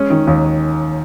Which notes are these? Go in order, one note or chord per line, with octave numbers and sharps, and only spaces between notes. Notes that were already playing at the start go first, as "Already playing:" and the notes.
Already playing: G#3 C#4
D#3
D#2